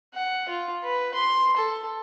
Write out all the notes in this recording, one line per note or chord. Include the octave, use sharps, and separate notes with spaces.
F#5
F4
B4
C6
A4